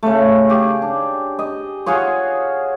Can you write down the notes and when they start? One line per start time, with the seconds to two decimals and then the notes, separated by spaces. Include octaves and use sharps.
0.03 C#3 A3
0.50 G4 G#4
0.82 D4
1.39 D#5
1.86 F4 F#4 G#4 C#5